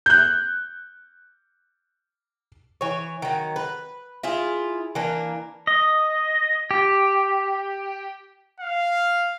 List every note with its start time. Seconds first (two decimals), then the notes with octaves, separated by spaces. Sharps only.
0.06 F#6 G6
2.81 E3 C#5
3.22 D#3 F#3
3.56 B4
4.23 E4 F4 G#4
4.95 E3 A#3 D4 A#4
5.67 D#5
6.71 G4
8.60 F5